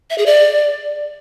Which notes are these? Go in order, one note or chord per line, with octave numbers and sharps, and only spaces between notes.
E5
G#4
D5